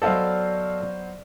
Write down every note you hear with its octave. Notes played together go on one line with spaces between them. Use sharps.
F#3 B3 A4 C5 D5 D#5 F5